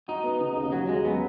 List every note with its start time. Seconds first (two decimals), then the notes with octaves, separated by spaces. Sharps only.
0.08 D#4 F#4
0.24 B3
0.41 C#3
0.56 D#2
0.72 F#3 F#4
0.89 G#3 C#4
1.04 F#3 B3